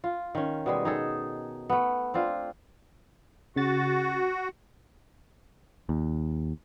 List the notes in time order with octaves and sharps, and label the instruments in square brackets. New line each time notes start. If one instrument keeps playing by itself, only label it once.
[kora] F4
D#3 C#4
B2 G3 G#3
D#4 G#4 A4
A3 B3
C4 D4 F4
[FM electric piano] C#3 A6 [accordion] F#4
[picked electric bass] D#2